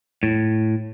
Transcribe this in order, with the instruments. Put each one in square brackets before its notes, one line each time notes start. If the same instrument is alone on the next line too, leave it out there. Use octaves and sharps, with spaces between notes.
[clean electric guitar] A2